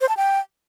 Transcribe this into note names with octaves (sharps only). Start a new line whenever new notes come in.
C5
A5
G5